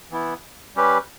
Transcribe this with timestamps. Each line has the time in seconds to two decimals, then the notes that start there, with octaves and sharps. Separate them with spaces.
0.11 E3 B3 E4
0.75 G3 C#4 G4 B4